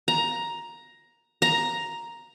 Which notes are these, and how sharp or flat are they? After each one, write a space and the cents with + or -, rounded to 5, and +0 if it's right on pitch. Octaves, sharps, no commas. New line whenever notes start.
A#5 +10
A#5 +5